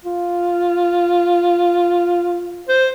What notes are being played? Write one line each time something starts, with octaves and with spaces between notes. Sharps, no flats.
F4
C5